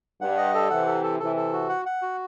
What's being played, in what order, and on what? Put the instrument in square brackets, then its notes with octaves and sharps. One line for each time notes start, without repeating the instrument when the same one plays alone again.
[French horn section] G2 [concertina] F#5
[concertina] D#5
A4
[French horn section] C3 E3 [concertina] F#5
[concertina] A4
A4
[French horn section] C3 E3 [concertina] A4
[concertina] A4
F#4
F#5
F#5
F#4